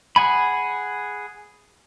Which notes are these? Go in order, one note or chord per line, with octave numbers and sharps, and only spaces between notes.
G#4 F#5 G#5 B5